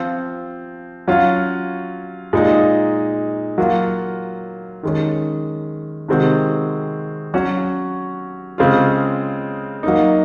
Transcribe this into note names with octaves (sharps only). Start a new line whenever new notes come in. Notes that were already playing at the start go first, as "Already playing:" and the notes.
Already playing: F3 C4 F4
F#3 C#4 F4
A#2 G#3 D#4
F#3 A#3 F4
D#3 G#3 C#4
C3 D#3 G#3 C4 F#4
F#3 C#4 F#4
C#3 G#3 C4 F4
F#3 A#3 D#4